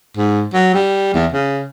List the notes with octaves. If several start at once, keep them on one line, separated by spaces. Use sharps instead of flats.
G#2
F#3
G3
E2
C#3